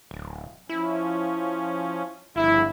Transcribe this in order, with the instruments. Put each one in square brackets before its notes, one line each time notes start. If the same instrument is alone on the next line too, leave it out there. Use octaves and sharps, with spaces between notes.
[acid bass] D1
[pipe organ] F3 C#4 [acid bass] E4
[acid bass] G1 [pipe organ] G2 C#3 F3 [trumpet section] E4